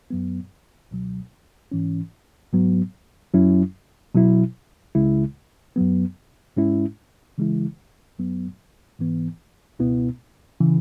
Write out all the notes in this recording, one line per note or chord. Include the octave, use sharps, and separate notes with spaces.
F#2 F#3 B3
C#2 B2 F#3
G#2 E3 C#4
G#2 F#3 B3
F#2 F#3 C#4 E4
B2 F#3 E4
C#2 C#3 G#3 E4
F#2 F#3 B3
G#2 G#3 C#4 E4
C#3 E3 G#3 E4
F#2 F#3 B3
G#2 E3 B3
C#2 B2 B3 E4
C#3 E3